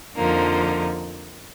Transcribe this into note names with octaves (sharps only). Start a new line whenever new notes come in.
F2 D3 F3 A#3 D#4